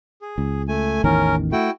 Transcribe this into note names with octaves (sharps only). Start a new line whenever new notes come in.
G#4
C#2
A3 G#5
A1 E2 D#3 C#4 A#4
A3 E4 F#4 G5